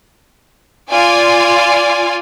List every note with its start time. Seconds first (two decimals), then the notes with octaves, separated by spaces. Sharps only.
0.91 F4 D5 G#5